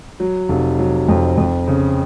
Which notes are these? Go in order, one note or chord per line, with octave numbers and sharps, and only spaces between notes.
F#3
F1
F#3
F2
F2
C#3